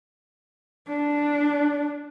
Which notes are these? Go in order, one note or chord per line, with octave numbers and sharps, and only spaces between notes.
D4